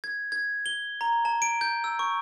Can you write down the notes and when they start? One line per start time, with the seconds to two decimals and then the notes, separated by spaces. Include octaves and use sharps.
0.04 G#6
0.32 G#6
0.66 G7
1.01 A#5
1.25 A5
1.42 D7
1.61 G6
1.84 E6
1.99 C#6